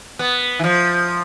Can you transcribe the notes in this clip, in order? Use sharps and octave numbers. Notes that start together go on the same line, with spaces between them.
B3
E3
F3